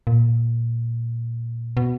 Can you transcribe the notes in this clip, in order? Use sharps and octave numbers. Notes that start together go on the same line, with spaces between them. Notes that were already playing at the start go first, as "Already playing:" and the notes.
A#2
B2